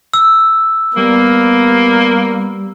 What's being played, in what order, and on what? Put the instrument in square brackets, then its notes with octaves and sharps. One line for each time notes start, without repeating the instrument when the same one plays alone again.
[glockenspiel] E6
[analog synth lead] G3 [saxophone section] A#3 [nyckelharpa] B3